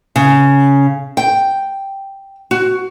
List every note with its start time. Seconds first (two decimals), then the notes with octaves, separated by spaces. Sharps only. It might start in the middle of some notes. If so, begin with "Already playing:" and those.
0.16 C#3
1.17 G5
2.51 F#4